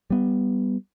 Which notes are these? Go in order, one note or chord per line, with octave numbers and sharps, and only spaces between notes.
G3 B3